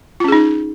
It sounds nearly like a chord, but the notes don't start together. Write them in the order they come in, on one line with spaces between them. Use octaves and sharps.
F4 C#4 G#4 D#4